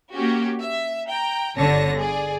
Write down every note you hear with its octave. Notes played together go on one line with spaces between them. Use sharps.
A#3 C#4 F#4 G4
E5
G5 A#5
G1 D3 C#5 A5 A#6
G#4 D5